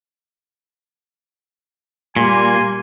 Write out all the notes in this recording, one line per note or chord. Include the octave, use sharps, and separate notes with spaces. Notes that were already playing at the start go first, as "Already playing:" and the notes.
A#2 G3 A#3 G#5 C6